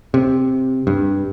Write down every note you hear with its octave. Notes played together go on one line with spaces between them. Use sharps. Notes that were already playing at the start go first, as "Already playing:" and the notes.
C3
G2